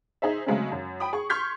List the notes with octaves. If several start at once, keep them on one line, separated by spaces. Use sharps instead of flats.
D#4 G#4 C5 E5
C#3 F#3 G#3 A3 C4 C#4
F#2
G5 B5 D#6
G#4 C#6
C6 C#6 F6 G6 G#6 B6